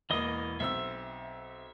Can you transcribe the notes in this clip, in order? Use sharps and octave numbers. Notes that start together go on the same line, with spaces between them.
E1 E3 A#3 D#5 D#6
B1 C4 E5 E6